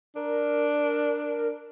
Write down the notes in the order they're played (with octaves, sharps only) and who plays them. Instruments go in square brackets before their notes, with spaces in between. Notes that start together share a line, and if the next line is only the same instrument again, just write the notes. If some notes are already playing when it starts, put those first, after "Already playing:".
[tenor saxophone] D4 [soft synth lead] A#4